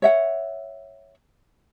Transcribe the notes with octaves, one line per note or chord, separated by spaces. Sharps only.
C#5 E5 F#5